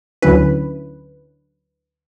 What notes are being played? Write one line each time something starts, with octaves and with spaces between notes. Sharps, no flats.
D2 D3 F#3 C#4 E4 B4